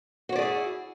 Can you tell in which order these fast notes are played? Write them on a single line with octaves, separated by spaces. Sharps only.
F#4 C#5 D5 G#4 E4